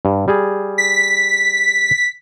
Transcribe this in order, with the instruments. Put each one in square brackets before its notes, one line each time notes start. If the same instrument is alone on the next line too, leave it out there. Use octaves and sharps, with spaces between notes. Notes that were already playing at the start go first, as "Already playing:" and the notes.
[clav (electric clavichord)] G2
G3 G#4
[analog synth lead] B6